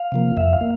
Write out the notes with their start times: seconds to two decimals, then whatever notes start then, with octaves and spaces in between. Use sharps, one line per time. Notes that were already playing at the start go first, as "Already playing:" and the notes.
Already playing: F5
0.12 C3 F3 A#3
0.37 F2 E5
0.53 F5
0.61 A#3